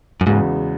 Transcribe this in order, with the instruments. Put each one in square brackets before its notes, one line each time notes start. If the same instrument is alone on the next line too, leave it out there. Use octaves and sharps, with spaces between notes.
[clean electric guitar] F#2
[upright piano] E2 C#3 G#3 B3 F#4 [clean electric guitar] G#2